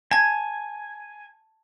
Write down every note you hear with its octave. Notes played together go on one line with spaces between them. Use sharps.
G#5 A5 G#6